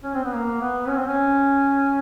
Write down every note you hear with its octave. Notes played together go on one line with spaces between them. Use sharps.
C#4
C4
B3
A#3
B3
C#4
C4
C#4